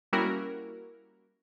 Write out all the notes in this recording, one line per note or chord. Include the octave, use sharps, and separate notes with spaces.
G3 A#3 C#4 E4 F#4 A#4